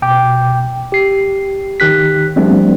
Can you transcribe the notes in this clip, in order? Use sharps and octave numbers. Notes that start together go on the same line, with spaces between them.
B2 G5 D6
G4 C7
D#3 G4 F#6 B6
F3 G3 A3 B3 C4 D4